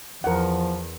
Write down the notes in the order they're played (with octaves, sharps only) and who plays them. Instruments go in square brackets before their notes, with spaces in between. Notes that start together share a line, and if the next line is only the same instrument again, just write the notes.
[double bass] E2 [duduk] F3 [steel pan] A#4 F#5